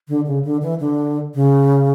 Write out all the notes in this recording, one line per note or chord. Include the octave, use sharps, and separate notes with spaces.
D3
C#3
D3
E3
D3
C#3